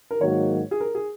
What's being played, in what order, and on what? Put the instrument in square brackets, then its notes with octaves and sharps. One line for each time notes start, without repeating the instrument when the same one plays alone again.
[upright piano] A#4
[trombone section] G#2 D#3 F#3 A#3 F#4 [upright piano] C#5
[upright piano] G#4
A#4
G#4